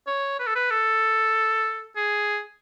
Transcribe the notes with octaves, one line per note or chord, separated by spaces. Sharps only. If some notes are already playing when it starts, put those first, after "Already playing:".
C#5
B4
A4
B4
A4
G#4